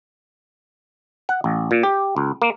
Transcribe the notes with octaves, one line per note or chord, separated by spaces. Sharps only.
F#5
A1
A#2
G4
C#2
A#3